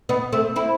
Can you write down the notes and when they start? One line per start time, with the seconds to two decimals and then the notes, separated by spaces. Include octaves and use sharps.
0.09 B3 D#4
0.33 A3 C4
0.56 C4 E4